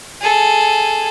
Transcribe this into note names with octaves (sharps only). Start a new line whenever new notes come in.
G#4 A4